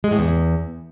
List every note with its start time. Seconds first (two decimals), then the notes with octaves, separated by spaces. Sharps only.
0.04 G#3
0.11 A2
0.19 E2